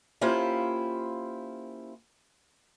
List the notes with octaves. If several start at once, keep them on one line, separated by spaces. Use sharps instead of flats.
A#3 C#4 E4 F4 G4 C5